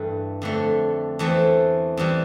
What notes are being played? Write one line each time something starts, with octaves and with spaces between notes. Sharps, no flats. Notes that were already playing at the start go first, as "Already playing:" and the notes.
Already playing: G2 E3 A3
F2 D3 A3
E2 E3 A3 C4
E2 E3 G3